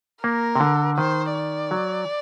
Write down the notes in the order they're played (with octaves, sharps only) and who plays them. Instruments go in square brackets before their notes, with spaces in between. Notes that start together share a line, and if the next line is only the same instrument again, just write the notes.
[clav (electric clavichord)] A#3 [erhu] A#4
[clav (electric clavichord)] C3
D3
[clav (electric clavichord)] D#3 [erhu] C5
[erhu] D5
[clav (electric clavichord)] F#3